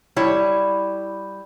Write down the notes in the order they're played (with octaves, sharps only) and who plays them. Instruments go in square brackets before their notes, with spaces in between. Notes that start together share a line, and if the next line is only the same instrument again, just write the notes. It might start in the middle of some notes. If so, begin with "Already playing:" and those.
[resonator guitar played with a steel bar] G3 E4 C#5